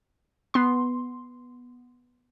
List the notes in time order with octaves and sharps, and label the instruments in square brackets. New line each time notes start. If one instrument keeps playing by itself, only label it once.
[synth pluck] B3 C6